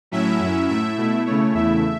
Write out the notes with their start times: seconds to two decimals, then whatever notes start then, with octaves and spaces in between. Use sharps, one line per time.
0.11 A2 F#3 C#4 E4 E5
0.40 F#2 F#3 C#4 E4
0.68 A2 A3 E4 E5
0.98 B2 A3 E4
1.26 C#3 A3 E4 C#5
1.54 E2 C#3 A3 E4 E5